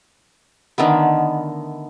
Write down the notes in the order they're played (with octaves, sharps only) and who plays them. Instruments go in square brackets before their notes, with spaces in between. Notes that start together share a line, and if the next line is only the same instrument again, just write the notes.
[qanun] D3 D#3 A3 B3